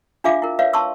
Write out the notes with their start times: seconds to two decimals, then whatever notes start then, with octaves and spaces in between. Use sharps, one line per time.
0.24 D4 F4 G#4 E5 F5 D6
0.42 E4 A#4
0.59 B4 C#5 E5 F5
0.73 A5 C6 C#6 E6